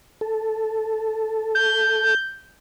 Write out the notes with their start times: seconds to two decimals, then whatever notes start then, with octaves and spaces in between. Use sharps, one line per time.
0.21 A4
1.55 G6